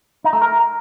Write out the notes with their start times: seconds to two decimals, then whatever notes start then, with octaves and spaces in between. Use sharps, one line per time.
0.24 D#4
0.33 A3
0.42 A#4